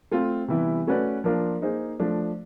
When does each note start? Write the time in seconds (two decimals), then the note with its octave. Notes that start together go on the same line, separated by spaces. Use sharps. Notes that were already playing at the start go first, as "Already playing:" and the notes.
0.11 A3 C4 F4
0.48 C3 E3 G3 B3 E4
0.87 A3 C#4 F#4 B4 D5
1.24 F3 A#3 D4 F4 A#4
1.62 A#3 D#4 G#4 C5
2.00 F3 A3 D4